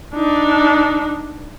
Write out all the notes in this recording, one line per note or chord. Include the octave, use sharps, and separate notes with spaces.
D4 D#4